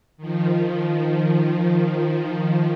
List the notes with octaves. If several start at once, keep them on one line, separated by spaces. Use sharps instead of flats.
D#3 F3